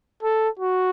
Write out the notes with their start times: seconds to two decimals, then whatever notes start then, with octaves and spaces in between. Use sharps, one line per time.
0.23 A4
0.60 F#4